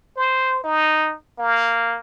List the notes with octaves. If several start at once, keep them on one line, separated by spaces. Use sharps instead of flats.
C5
D#4
A#3